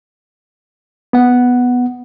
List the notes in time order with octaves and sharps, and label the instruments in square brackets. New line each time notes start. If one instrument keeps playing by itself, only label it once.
[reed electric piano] B3 F#5